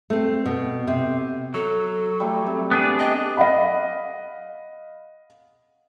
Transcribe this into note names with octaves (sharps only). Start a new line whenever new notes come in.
A3 C4
B2
C3
F#3 A4
G3 A3 D6
C3
B3 D4 G#4
G4 D#5
D#5 F5 F#5 B5